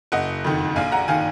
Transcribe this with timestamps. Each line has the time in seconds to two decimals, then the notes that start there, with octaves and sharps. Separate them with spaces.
0.12 F#1 D#5 F#5
0.44 F2 D#3
0.76 A#1 F5 G#5
0.92 F#5 A#5
1.08 D#3 F5 G#5